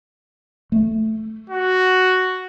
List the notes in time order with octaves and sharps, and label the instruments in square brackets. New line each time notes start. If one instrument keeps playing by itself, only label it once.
[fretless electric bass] A3
[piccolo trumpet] F#4